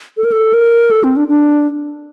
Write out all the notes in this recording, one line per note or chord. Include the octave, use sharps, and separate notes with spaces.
A4
A#4
A4
A#4
A4
C4
D4
D4